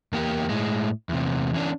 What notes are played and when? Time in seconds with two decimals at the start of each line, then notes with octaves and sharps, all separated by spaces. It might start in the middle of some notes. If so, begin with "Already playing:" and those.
0.13 E2 A#3 G4
0.49 A2 G#3
1.09 E2 C3
1.54 E3 C#4 D4